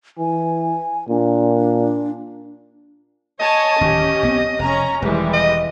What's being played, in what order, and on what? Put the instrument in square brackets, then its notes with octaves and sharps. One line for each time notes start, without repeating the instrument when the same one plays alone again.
[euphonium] E3 [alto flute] G#5
[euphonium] A#2 [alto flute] D4
[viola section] C#5 G#5 A5 [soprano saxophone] D#5
[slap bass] D1 D#2 A#2 [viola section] C#4 G4
[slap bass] B1 B3 C4
[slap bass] F1 [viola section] C#4 A#5
[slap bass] E1 D#3 [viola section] E3 G3 G#3
[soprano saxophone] D#5